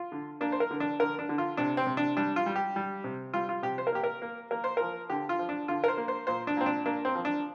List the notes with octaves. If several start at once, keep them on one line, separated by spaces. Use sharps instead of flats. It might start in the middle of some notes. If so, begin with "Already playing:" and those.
Already playing: F4
D3
A#3 D4
C5
A#4
D3
D4
D3 A#4
D4
D3
F4
C3 D4
C4
C3
D4
G3 D4
F4
G3
G4
G3
C3
G3 F4
F4
C3 G4
C5
A#4
A#3 G4
A#4
A#3
A#3 A#4
C5
F3 A#4
D3 G4
F4
F3
D4
D3 F4
A#4
C5
A#3
C5
A#2 C5
D4
A#2 C4
D4
A#3 D4
C4
F3
D4